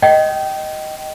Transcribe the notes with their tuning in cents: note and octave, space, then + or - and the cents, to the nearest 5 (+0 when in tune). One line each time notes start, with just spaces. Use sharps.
D#5 +0 G5 -20